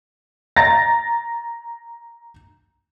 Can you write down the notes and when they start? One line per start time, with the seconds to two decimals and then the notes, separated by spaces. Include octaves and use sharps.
0.56 A#5 A6 A#6